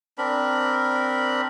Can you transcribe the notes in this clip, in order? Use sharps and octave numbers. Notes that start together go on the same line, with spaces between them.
C4 D4 A#4 B5